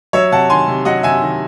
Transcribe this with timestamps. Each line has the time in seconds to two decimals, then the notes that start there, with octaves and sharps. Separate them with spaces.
0.13 F#3 C#5 E5
0.32 C3 F#5 A5
0.50 D#3 G#5 C6
0.68 C3
0.85 F#3 D#5 F#5
1.03 C3 E5 G#5
1.22 D#3